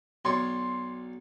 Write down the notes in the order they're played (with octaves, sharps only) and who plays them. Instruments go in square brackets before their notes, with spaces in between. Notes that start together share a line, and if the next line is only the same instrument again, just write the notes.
[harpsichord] B1 C#5 D5 [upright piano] C6